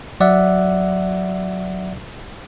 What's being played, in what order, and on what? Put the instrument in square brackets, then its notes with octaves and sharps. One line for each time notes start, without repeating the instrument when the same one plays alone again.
[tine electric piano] F#3 D5 E5 F#5